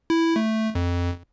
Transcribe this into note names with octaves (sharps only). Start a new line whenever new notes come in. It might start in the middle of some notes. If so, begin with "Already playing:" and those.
E4
A3
F2